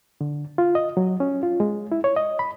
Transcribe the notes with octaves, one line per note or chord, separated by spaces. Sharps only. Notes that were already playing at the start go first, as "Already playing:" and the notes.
D3
F4
D#5
F#3
C#4
F4
G#3
E4
C#5
D#5
B5